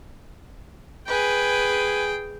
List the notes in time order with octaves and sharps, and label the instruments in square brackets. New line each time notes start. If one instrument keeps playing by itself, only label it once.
[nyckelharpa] G#4 G5 [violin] B4 G#5